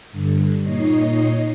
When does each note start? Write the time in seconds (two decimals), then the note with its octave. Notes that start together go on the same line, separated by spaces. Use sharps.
0.12 G2 D3
0.63 A#2 D#4 C#5 D#5 C7